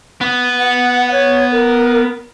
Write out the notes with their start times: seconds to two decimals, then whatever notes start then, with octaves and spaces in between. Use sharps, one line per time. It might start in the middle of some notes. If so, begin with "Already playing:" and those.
0.21 B3
0.59 F#5
1.12 C#5
1.52 A#4